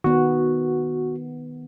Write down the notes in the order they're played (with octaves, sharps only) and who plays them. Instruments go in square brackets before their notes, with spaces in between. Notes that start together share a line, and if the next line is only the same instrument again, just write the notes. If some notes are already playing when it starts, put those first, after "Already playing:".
[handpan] D#3 B3 [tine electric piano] F#4